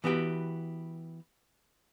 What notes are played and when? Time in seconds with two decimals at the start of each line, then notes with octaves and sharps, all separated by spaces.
0.04 E3 B3 F#4 G4